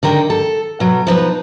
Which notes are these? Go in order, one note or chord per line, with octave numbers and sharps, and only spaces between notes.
D3 D#3 A#4 G5
A4
B2 F#3
F3 D#4 B4